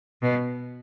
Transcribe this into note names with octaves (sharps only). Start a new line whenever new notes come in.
B2